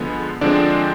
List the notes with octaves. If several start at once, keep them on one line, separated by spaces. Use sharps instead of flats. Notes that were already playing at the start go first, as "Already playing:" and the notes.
Already playing: D3 F3 G#3 B3
D3 F3 G#3 C4 D4 D5